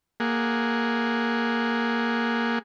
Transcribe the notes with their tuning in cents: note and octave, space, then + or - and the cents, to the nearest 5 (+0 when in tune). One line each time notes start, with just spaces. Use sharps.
A#3 +0 G#4 +0 F#5 +0